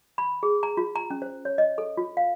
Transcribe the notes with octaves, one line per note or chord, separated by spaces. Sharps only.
B5
G#4
A#5
F4
A#5
C#4
C5
C#5
D#5
A4
F4
F5